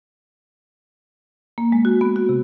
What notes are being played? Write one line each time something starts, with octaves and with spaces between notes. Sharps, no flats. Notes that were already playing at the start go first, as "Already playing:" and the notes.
A#3
G#3
F#4
B3
F#4
C3